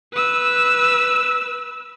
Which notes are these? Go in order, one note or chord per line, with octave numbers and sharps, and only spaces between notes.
B4 E6